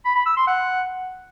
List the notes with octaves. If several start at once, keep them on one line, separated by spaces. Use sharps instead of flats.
B5
B5
E6
C6
F#5